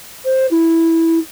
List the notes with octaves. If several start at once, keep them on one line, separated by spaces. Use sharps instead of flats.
C5
E4